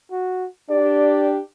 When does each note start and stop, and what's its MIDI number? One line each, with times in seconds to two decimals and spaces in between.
0.11 0.47 66
0.70 1.39 62
0.70 1.39 67
0.70 1.29 74